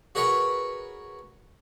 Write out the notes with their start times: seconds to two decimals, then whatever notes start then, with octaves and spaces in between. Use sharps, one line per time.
0.15 F#4 G#4 A#4 B4 C#5 F#5